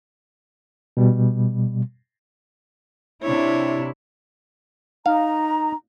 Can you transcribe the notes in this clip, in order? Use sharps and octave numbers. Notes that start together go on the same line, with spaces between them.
B2 G3
C3 D4 E4 C#5
D#4 F5 A#5